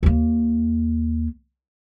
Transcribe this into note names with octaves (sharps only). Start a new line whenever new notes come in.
D#2 A#3